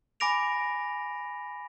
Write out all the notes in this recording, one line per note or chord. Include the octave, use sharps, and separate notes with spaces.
G#5 B5 D6 A#6 D7 F7